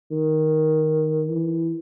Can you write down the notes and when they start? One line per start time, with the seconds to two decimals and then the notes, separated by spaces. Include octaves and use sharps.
0.11 D#3
1.29 E3